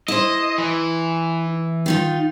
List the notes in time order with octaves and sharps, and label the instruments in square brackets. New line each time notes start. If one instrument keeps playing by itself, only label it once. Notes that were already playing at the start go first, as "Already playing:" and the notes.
[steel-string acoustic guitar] E4 C5 [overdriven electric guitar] D#5
[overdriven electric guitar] E3
[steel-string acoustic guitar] D#3 D#4 F4